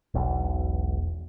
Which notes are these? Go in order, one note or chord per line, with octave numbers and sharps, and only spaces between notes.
E1 B1